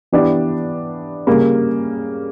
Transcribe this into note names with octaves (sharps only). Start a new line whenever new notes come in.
E3 B3 D4 G4
C#3 G3 A#3